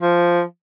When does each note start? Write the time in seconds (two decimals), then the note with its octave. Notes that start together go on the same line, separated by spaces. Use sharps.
0.02 F3